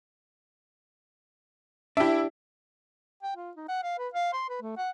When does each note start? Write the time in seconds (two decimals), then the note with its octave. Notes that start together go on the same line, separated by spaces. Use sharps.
1.97 D4 E4 G4 E5
3.23 G5
3.36 F4
3.56 D#4
3.68 F#5
3.83 F5
3.98 B4
4.14 F5
4.33 C6
4.49 B4
4.61 A3
4.77 F#5